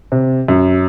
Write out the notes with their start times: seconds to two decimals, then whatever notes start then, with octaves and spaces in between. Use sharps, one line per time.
0.12 C3
0.48 F#2